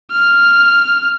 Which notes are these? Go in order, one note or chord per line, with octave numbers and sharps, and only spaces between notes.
F6